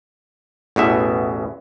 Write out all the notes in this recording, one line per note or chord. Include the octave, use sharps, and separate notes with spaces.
A1 E2 B2 E5